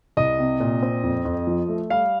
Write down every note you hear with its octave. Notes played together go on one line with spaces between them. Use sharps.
C2 D#5
C3
A#2
C4
F2
F2
F3
A3
G3 F5